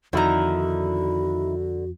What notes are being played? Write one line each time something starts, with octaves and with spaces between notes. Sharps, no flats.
F2 D3 D#3 D#4 E4 F#4 A#5